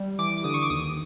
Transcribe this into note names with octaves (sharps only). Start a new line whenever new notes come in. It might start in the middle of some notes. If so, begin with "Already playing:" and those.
Already playing: G3
E3 D6
D6
D3 D#6
C#6
D6
D#2 D#6